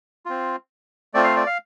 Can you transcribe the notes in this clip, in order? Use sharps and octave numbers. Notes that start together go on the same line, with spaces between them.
C4 F4
A3 C4 F4 D5
F5
D5
F5